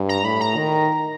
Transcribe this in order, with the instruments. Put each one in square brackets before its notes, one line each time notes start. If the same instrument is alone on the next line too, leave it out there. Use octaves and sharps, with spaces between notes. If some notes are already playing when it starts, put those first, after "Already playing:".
Already playing: [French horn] G2
[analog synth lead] A#5
[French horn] A2 [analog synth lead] B5
[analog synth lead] A#5
[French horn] D#3